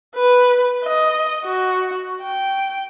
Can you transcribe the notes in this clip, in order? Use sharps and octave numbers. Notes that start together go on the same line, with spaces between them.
B4
D#5
F#4
G5